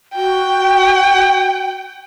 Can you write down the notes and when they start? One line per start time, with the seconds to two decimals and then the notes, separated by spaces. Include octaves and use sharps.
0.16 F#4 G5